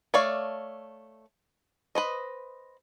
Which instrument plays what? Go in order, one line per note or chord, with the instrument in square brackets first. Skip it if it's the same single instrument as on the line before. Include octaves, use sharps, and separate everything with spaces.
[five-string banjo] A3 C#5 D5 F5
B4 C5 D#5